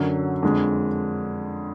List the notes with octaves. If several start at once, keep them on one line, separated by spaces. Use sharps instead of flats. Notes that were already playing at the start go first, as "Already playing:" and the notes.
Already playing: F#2 D3 F#3
F2 D3 G#3